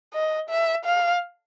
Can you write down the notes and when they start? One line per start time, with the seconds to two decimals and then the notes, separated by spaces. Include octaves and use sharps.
0.14 D#5
0.49 E5
0.85 F5